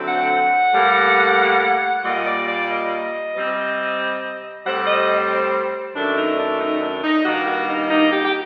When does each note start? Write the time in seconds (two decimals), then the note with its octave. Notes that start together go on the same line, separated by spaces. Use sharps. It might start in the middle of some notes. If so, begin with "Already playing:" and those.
Already playing: D3 F#3 A3 C4
0.08 F#5
0.74 A2 G3 A#3
2.04 A#2 G3 A#3 D#5
2.27 D5
2.48 D5
2.70 D#5
3.34 C3 G3 C4
4.65 A2 G3 C4 F#5
4.87 D#5
5.95 F#2 D#3 A3 D4
6.17 D#4
6.39 D4
6.61 D#4
6.82 D4
7.04 D#4
7.25 G2 D#3 G3 A#3 F#4
7.47 F#4
7.69 D#4
7.90 D#4
8.12 G4
8.25 G4